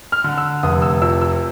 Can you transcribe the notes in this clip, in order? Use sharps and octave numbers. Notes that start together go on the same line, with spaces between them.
F6
D3
E6
F1 D#6
E6
F2 E6
E6